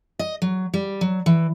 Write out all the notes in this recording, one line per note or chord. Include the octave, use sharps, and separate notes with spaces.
D#5
F#3
G3
F#3
E3